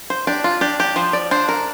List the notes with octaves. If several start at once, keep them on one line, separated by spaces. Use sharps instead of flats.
C5
D4 G4
F4
D4 G4
G4
F3 C5
D5
D4 C5
A#4